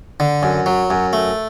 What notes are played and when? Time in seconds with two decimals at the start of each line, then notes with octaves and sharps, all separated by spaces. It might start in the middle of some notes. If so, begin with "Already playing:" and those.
0.20 D3
0.43 F#2
0.66 F#3
0.90 F#2
1.13 A3